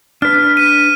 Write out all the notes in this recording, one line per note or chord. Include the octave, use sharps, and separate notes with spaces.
D4 B4 F6
B6 D#7